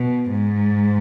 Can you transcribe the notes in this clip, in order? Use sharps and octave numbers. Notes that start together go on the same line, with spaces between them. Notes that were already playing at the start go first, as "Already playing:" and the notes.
Already playing: B2
G#2